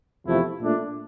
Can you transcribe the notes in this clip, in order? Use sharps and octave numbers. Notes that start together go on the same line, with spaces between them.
E2 C3 F3 A3 E4
A#2 A3 D4